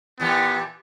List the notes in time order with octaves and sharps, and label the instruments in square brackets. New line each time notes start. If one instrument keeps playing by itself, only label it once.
[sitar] A#2 E3 G4 [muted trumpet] B3